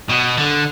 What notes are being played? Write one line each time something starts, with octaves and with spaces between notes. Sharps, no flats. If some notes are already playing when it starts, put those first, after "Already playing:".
B2
D3